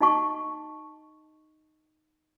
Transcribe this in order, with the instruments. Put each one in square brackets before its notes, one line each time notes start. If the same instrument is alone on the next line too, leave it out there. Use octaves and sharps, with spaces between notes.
[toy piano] D#4 D#5 A5 C#6